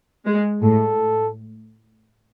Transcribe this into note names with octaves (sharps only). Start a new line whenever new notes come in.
G#3
A2 A4